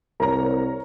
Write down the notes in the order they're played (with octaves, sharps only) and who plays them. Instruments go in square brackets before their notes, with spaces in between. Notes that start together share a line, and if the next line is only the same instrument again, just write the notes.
[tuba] C2 [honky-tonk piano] A#4 C#5 A#5